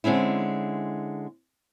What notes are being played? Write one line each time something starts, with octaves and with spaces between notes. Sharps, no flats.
D3 G#3 C4 C#4 E4